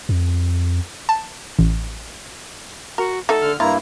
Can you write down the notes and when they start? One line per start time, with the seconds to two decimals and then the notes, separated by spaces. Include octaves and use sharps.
0.09 F2
1.09 A5
1.59 A1
2.98 F#4 A#4
3.29 A3 D#4 F#4 A4
3.42 D3 F6
3.60 G2 A#3 E4 F4 A#5